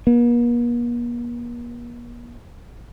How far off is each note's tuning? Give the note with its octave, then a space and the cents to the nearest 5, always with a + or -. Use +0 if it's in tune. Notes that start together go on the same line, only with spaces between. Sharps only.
A#3 +45